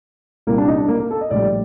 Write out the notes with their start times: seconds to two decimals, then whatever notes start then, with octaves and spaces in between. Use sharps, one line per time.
0.47 C2 A#2 G3 A#3
0.58 D4
0.68 D#4
0.78 D4
0.88 A#3
1.00 A#3
1.11 A4
1.21 D#5
1.30 A#1 A2 G3 D5